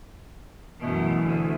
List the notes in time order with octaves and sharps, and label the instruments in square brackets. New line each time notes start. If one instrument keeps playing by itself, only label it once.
[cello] F#2 B2 [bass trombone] E3 [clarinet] A3
[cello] D2